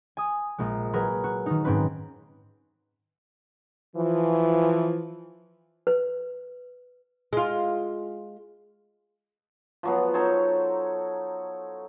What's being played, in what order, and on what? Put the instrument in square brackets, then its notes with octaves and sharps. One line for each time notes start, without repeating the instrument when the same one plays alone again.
[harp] G#5 D#6
A#1 G#3
F#3 G#4 A#4 B4
F#4
D#3 D#4
G#2 C4 C#4 B4
[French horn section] E3 F3
[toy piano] B4
[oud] G#3 F4
[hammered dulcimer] F3 F#3 B3
D#4 A4 C5 C#5